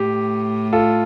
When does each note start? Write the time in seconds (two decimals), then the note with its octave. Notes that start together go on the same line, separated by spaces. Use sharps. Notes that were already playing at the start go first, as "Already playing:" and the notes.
Already playing: A2 G4
0.73 F4 A4